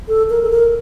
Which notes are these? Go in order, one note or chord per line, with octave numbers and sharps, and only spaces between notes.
A4
A#4
A4
A#4